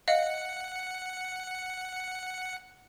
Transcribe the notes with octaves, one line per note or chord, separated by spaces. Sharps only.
D#5 F5 F#5 C#7